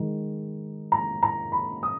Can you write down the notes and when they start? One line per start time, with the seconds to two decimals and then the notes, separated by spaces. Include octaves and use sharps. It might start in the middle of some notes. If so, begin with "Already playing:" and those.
Already playing: D#3 G#3 D#4
0.92 A#5
1.23 A#5
1.52 B5
1.83 D#6